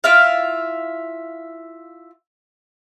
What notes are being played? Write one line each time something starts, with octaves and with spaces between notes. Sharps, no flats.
E4 F4 E5 F5